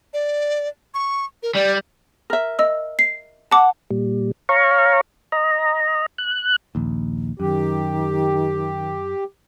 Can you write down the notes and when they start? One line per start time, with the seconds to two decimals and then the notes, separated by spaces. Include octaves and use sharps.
0.13 D5
0.94 C#6
1.43 A#4
1.55 G3 D5
2.30 A#4 E5
2.59 D#5 E6
2.99 C7
3.51 F#5 A5 D6
3.90 A#2 G3
4.49 C#5 F5 A#5 C#6
5.32 D#5 A#5
6.18 F#6
6.75 A#1 D#2
7.40 F#2 D#3 G4